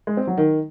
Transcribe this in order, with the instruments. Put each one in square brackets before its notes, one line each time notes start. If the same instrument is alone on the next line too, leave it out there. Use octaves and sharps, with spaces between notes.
[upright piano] G#3
C4
F#3
D#3